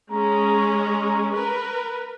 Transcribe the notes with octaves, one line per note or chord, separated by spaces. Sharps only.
G#3 C#4 A#5
A#4 B4